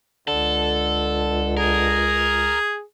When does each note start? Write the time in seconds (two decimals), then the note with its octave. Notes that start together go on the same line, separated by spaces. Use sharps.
0.28 C#2 D3 A4
1.57 G#4 A#4